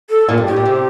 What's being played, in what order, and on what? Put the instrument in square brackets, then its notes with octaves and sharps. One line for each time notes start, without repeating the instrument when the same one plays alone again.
[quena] A4
[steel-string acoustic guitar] A#2
G2
[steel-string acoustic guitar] A2 [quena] G4
[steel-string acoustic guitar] A#2
C3